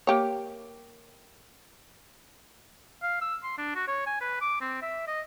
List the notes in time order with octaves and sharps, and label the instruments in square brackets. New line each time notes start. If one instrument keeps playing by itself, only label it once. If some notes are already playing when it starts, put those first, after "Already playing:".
[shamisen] A#3 G4 C#5
[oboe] F5
E6
C6
D4
F#4
C#5
G#5
B4
D6
C4
E5
D#5